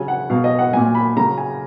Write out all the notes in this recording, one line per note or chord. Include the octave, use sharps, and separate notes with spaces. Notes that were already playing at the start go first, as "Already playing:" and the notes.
Already playing: C#3 F#3 G#5
F#5
B2 F#3 F5
D#5
F#5
A#2 F#3 G#5
B5
C#3 F#3 A#5
G#5